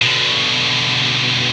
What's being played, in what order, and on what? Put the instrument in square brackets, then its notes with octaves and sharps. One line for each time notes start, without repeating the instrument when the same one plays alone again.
[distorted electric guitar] B2 D3